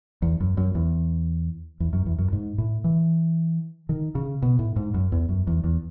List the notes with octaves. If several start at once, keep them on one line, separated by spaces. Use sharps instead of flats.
E2
F#2
F#2
E2
E2
F#2
E2
F#2
G#2
A2
E3
D#3
C#3
B2
A2
G#2
F#2
E2
F#2
E2
E2